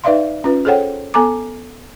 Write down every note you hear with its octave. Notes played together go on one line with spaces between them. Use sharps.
D#4 B4 D5 E5 F5 C6
C#4 F4 B4
G#4 A4 C5 C#5 F#5 G5
B3 A4 G#5 A#5 D6